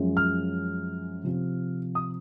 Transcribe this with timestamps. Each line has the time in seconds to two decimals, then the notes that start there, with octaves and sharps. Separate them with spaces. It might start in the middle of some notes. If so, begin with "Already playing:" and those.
Already playing: F#2 F3 G#3 C#4
0.17 F6
1.24 C3 F3 C4
1.95 D#6